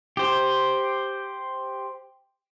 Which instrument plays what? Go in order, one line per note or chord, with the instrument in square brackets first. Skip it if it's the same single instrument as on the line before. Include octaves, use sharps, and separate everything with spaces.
[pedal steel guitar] G4 C5